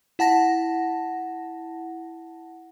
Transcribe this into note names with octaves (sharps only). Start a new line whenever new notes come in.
E4 F#5 A5 A#6